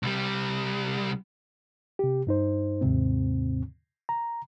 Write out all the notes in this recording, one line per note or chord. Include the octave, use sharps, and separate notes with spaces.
C2 G3
C3 G4
G2 D#4 C5
D#2 G#2 C3 C4
A#5